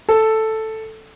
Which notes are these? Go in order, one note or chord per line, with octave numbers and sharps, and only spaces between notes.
A4